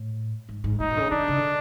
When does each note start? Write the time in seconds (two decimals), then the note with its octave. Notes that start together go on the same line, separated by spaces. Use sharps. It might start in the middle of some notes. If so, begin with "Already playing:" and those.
Already playing: A2
0.49 G#2
0.64 G#2
0.80 A#2 D#4
0.91 B2
0.97 D3
1.00 C#3
1.11 D#3 D4
1.20 D3
1.28 C#3
1.37 D3